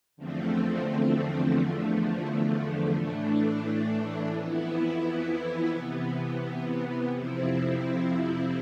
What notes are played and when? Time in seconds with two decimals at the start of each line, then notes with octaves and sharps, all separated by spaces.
0.17 E2 D3 F3 A3 C4
1.56 E2 D3 F3 A3
2.95 A2 E3 A3 D4
4.33 F2 E3 B3 E4
5.72 C3 E3 B3
7.11 F2 C3 F3 C4 E4